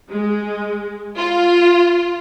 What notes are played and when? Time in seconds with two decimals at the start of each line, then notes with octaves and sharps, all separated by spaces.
0.11 G#3
1.17 F4